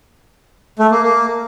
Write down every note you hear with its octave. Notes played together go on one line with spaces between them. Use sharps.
A3
A#3
A#3